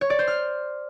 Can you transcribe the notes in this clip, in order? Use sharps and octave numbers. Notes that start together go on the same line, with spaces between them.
C#5
D5
C5
F6